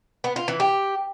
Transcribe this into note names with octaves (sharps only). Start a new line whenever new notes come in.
B3
F4
E3
G4